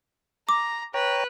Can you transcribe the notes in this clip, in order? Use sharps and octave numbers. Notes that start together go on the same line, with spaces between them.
A#5 D6
B4 C#5 G5 A#5